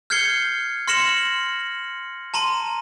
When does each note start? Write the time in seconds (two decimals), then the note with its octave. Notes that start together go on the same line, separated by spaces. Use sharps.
0.10 F6 G6 G#6 C7 C#7 G7
0.88 C6 F6 A#6 C#7 E7 F#7
2.34 A5 A#5 C6 D#7